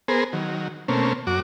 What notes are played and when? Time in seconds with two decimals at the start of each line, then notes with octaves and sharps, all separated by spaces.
0.08 B3 G#4 A#4 C5
0.33 D#3 F#3
0.88 B2 A3 A#3 C4 C#4
1.27 F#2 F#4 D6